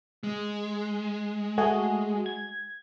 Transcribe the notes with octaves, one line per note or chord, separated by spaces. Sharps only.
G#3
A3 F#4 G#4
G#6